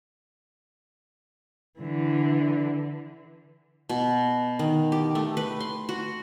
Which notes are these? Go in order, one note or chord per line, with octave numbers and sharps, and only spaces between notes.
D3 E3
B2
D#3
G4
A3
B4
C6
F#4